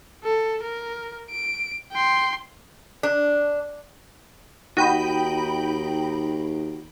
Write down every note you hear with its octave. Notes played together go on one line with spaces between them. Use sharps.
A4
A#4
D7
G5 C6
D4
D#2 D#4 F#4 G5 B5